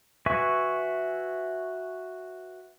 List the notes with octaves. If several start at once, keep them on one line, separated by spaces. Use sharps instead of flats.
F#4 B4 E5 G#5 C#6